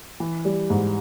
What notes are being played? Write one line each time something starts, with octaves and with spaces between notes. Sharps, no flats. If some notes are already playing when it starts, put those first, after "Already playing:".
E3
G3
G#2